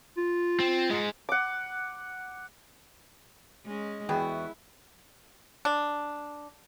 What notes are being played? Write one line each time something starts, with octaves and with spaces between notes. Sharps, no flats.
F4
C4
G#2 G#3
F#5 D6
G#3 C#4 D#5
E2 B3 E4 F#4 G#4 G5 B5
D4